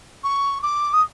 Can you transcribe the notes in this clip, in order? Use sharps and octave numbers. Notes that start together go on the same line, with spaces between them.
C#6
D6
D#6